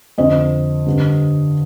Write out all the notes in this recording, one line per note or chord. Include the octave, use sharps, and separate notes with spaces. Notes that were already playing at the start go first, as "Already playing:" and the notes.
F2 D3 C5 D#5
G2 D3